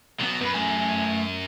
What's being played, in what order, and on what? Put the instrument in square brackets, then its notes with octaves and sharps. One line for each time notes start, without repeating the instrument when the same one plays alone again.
[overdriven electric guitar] B1 B3 [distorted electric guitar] F#3
[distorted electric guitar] F#2 [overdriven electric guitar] B4 B5
[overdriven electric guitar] A3 G#5